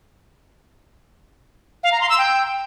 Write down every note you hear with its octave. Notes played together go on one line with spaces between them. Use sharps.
F5
A#5
C6
E6
G5